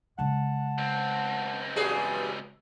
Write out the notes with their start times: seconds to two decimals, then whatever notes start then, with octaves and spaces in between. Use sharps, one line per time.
0.19 C#3 G#3 F#5 A5
0.78 C#2 C4
1.76 E2 G2 G3 F#4 G#4